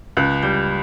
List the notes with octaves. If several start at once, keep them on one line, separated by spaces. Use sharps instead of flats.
C#2 F#6
G3 G6